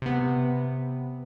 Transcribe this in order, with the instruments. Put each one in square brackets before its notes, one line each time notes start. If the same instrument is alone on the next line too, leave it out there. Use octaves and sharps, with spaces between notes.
[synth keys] C3 B3